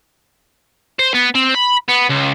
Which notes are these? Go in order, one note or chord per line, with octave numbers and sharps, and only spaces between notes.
C5
B3
C4
B5
B3
C#2